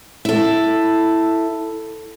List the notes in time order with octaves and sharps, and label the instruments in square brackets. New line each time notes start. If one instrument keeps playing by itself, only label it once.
[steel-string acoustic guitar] E4 A4